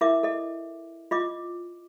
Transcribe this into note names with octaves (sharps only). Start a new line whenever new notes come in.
E4 A#4 E5 D6
A4 D#5
F4 D#5 D6